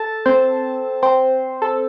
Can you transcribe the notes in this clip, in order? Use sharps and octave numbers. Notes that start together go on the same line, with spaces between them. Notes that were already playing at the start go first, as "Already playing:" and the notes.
Already playing: A4 A5
C4 C5
C4 C5
A4